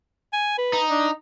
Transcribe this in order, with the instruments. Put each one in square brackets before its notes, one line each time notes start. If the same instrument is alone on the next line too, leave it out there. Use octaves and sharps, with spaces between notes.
[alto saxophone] G#5
B4
[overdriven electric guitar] D#4
[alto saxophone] D4